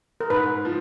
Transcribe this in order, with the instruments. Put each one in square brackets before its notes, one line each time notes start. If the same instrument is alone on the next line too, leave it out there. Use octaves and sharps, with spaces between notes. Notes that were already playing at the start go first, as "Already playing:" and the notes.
[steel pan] A#4
[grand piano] G#2 [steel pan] B4
[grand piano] F3